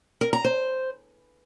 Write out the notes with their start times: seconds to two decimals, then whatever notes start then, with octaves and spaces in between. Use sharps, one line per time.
0.21 A#4
0.33 A#5
0.45 C5